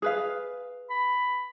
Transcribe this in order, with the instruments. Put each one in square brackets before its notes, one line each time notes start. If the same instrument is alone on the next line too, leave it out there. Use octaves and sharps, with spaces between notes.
[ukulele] G#4 B4 F5
[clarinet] B5